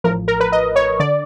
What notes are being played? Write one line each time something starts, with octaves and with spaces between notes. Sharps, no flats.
A1 A2 F3 A#4
A#4
B4
D#5
C#5
D3 D5